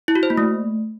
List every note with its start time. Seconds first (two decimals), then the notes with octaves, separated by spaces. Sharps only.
0.08 E4
0.15 F#4
0.23 C5
0.30 A#3
0.38 A3